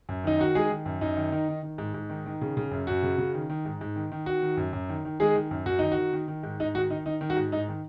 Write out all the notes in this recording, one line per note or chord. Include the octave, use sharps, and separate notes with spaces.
F#2
D#3 D#4
D#3 F#4
D#3 G#3 G#4
D#3
F#2
F#2 D#4
D#3
D#3
D#3
D#3
G#2
G#2
D#3
D#3
C#3
C#3
F#2
F#2 F#4
C#3
C#3
D#3
D#3
G#2
G#2
D#3
D#3
D#3 F#4
D#3
F#2
F#2
D#3
D#3
D#3 G#3 G#4
D#3
F#2
F#2 F#4
D#3 D#4
F#4
D#3
D#3
D#3
G#2
G#2 D#4
D#3 F#4
D#3 D#4
D#3 D#4
D#3
F#4
G#2
G#2 D#4
D#3